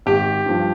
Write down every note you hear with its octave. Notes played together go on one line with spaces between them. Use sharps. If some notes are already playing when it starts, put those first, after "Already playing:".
G#1 G4
G2 F3